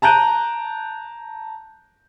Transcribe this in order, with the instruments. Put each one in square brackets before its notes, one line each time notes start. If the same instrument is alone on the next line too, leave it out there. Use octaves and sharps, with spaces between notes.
[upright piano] A5 A#5 F#6 G6 D7 D#7